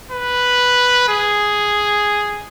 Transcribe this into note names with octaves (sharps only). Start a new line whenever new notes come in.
B4
G#4